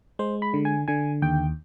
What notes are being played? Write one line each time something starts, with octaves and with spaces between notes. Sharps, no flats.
G#3 C5
B5
D3
G#5
D3 G#5
D#2 G5